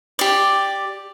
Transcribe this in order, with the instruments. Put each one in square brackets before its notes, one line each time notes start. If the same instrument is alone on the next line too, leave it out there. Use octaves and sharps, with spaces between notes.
[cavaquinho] G4 D5